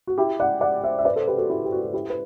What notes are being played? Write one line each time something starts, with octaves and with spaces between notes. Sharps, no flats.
F#4
E4 G4
D5 F#5
D5 F#5
C5 E5
E5
B4 D5
A4 C5
G4 B4
F#4 A4
E4 G4
G4
F#4
F#4
E4 G4
B4